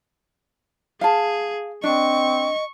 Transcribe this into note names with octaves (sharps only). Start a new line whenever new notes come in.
G#4 F5 A5
C4 D4 D#5 C#6